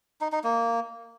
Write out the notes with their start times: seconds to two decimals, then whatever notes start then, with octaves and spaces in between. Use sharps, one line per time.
0.21 D#4
0.32 D#4
0.44 A#3